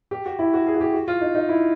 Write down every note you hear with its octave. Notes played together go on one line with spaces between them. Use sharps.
G4
F#4
E4
F#4
G#4
F#4
G4
F#4
F4
D#4
D#4
E4